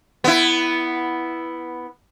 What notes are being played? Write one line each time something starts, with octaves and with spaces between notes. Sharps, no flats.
B3 E4